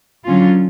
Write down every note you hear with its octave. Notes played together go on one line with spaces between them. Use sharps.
D3 F#3 C#4 F4